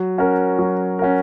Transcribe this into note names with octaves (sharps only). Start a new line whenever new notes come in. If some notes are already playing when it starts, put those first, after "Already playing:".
Already playing: F#3
C#4 F#4 A#4
F#3
C#4 F#4 A#4